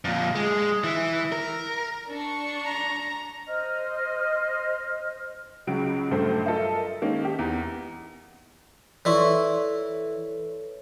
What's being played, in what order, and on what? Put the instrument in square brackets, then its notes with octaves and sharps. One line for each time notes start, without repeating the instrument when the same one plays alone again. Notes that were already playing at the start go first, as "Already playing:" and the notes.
[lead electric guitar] F2 A#2
G#3
E3
A#4
[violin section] D4 C#6
[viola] A#5
[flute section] C5 D#5 F6
[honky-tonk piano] C#2 C#3 F#3 D7
A#1 G2 F#3 A3 C5
F4 A4 A#4 D#5 E5
D#3 G#3 A#3 C#4 D#4
G4
E2 A#5
[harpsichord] E3 E4 [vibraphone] A4 B4 C#5 [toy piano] D5 C6 C#6